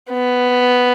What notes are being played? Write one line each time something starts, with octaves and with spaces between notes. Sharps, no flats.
B3